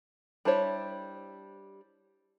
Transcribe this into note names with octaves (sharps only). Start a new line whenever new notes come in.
G3 D4 E4 C5 C#5